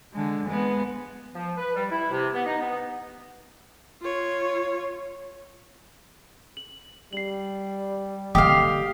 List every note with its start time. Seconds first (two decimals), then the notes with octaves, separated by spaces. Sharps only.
0.13 D3 G#3
0.46 G#3 B3
1.35 F3
1.57 B4
1.75 G3
1.90 E4
2.11 C3
2.34 B3
2.46 D#4
2.61 B3
4.02 F4 C#5
6.57 F#7
7.13 G3 C7 F#7
8.35 D3 A#3 G4 D#5 F5 D6 D#6